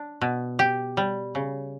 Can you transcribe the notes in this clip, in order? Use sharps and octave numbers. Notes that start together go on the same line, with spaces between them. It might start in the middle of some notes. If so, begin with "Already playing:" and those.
Already playing: D4
B2
G4
G3
C#3